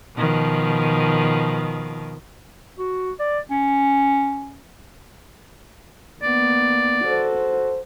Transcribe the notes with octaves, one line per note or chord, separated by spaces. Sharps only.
B2 D#3 F3
F#4
D5
C#4
A#3 B3 D5
F#4 A4 C5